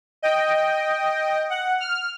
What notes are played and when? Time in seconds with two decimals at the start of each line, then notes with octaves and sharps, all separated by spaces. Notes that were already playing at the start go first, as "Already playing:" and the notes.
0.22 D#5 G5
1.50 F#5
1.80 F6